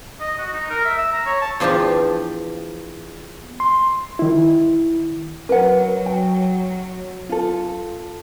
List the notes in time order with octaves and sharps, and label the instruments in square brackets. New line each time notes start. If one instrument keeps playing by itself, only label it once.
[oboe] D#5
F#4
D#4
A#4
E5
E6
A#5
C#5
A5
[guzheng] E2 F3 D4 F4 G4
[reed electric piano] C6
D#3 E4
[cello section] F#3 [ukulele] A#4 B4 F#5
[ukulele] G5
F4 A4